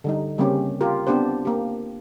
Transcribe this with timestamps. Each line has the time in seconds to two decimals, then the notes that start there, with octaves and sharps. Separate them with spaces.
0.04 D3 G3 D#4
0.38 C#3 G3 A#3 C4 C#4 G4
0.81 F4 G4 A#4
1.07 B3 C4 D4 G4 C5
1.45 A#3 G4